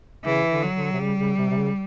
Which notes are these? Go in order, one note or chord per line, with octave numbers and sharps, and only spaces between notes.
C#3 E3
D3
F#3
D3
C3
C#3 G3
C#3
C3
C3
C#3